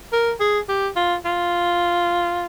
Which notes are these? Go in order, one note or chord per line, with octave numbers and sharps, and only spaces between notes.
A#4
G#4
G4
F4
F4